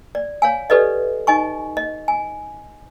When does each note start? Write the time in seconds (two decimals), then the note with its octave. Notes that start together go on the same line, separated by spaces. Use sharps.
0.15 D5
0.42 C#5 F5 G#5
0.70 G4 A4 B4 D5 D#5
1.27 D#4 D#5 G#5 C#6
1.77 D#5
2.08 G#5